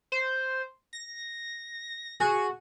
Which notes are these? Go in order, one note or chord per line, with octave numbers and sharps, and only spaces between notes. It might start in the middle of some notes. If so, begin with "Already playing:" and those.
C5
A#6
F#4 G#4